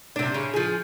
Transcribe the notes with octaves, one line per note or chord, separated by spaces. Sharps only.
C3 D4
C#3
F3 G#4